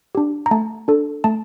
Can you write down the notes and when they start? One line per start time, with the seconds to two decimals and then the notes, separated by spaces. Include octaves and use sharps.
0.15 D4 G4
0.46 A#5
0.51 A3 A5
0.88 D4 A4
1.24 A3 A5